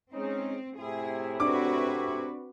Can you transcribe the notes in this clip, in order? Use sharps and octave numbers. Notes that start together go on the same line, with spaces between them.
G#3 C4 C#4 D#4
A2 C3 E4 G#4
C4 D4 F#4 B4 D6